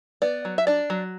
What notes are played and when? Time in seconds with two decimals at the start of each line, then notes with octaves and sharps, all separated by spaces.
0.22 B3 D5
0.45 F#3
0.58 E5
0.67 D4 D5
0.90 F#3